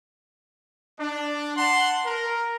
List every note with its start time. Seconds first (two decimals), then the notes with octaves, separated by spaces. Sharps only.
0.99 D4
1.57 F#5 A5 C6
2.05 A#4